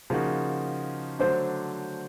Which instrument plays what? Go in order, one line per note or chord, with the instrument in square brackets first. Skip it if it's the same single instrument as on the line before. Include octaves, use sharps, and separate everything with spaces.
[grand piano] C#3 F3 A#3 D#4 F#4
[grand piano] D3 F#3 A3 D4 [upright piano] C5